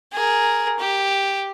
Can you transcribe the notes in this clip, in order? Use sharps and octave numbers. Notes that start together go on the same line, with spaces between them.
G#4 A#4
G4